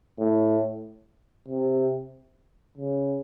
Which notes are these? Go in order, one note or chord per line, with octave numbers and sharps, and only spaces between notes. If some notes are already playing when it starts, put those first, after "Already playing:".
A2
C3
C#3